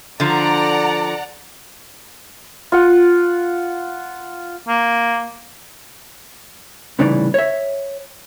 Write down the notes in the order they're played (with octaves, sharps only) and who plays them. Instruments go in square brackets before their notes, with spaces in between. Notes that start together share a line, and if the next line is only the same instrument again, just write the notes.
[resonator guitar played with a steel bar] D3 F3 [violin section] D5 F#5 A#5
[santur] F4 F#5
[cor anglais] A#3
[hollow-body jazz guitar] C2 A2 C#3 E3 D#4 D5
C#5 E5